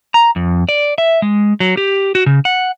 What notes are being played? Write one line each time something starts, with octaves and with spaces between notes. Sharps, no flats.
A#5
F2
D5
E5
G#3
F#3
G4
F#4
C#3
F#5